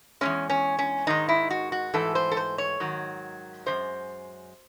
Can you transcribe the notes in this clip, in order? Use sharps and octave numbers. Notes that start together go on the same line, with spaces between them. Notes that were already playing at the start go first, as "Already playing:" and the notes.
E2 C#3 G#3 C#4
C#4
C#4
G#2 D#3 G#3 D#4
E4
F#4
F#4
G#2 E3 A3 A4
C5
A4
C5
C#5
G#2 D#3 F#3
F#2 E3 G#3 C5